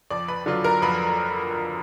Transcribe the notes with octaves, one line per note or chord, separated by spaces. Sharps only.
F2 D5 D6
B4 B5
D3 F#3 D4 F4
A#4 A#5
F2 B4 B5